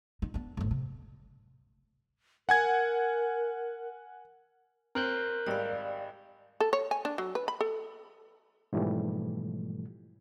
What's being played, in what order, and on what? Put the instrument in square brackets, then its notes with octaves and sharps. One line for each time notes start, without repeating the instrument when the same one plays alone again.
[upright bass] D#4
B3 D4
G#1 A2
C3
[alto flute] A#4 [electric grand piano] F#5 G#5 G#6
[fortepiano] C4 [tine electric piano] A#4 F#6 G6
[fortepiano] G#1 G3 [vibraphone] D5 F5
[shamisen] A4
C#5
G#5
D4
F#3
B4
B5
A4
[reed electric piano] G#2 B2 E3 F3 G3 A3